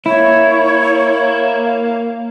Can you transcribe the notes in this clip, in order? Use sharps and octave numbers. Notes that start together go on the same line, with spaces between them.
A#3 E4 C#5